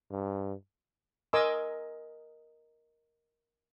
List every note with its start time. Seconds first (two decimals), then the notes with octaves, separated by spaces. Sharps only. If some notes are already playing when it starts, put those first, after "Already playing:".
0.11 G2
1.33 A#4 D#5 G#5 C6 D6 E6